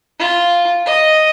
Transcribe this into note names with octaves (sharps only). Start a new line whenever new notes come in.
F4
D#5